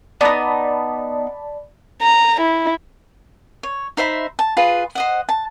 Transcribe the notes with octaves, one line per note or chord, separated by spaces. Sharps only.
B3 D#4 D5 A5 B5
A#5
E4
C#5
D#4 C5 E5 B5
A5
F4 G#4 B4
C5 D#5 F#5
A5